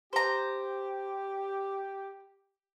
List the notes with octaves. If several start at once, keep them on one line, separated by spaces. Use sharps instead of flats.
G4 C5 A#5